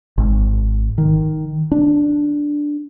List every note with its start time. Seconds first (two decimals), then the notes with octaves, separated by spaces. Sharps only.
0.18 G#1
0.98 D#3
1.72 D4